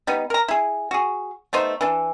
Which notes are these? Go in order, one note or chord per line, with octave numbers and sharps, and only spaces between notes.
G3 B3 D#4
A#4 A#5
E4 G#4
F#4 G#4
A3 B3 D#4 C5
E3 D4